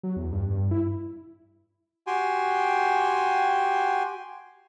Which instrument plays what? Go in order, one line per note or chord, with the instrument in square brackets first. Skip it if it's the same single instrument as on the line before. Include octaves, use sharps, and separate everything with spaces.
[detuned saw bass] F#3
E2
G2
G2
E4
[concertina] F#4 G4 G5 G#5 C6